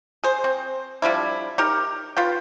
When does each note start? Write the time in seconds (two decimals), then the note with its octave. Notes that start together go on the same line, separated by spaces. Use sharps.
0.24 G#4 C5
0.44 C4
1.02 F3 G3 D4 E4
1.58 D#4 G4 A#4
2.17 F4 B4 G5